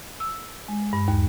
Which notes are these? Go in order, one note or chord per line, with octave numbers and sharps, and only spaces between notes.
E6
G#3
G2
D#2